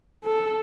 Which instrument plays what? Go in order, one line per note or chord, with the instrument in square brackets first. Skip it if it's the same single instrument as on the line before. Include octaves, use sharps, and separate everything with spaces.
[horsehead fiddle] A4